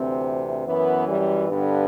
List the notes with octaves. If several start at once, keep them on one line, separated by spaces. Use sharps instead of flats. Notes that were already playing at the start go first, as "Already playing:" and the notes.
Already playing: D2 C3 E3 C4
F#2 E3 B3
G3
G2 D3 B3